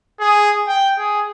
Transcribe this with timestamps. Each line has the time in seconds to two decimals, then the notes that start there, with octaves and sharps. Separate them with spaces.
0.20 G#4
0.67 G5
0.98 G#4